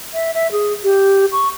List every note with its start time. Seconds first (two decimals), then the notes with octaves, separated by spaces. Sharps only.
0.14 E5
0.34 E5
0.52 G#4
0.84 G4
1.32 C#6